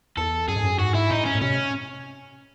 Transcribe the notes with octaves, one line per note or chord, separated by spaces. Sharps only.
E2 A4
F#2 G#4
G#2
F#2
G#2 F#4
E4
A2 D#4
C#4
A2
C3 C#4